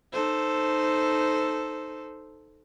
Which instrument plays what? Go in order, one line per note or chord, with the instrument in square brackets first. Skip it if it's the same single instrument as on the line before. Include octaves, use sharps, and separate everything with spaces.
[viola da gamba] D#4 A4 C5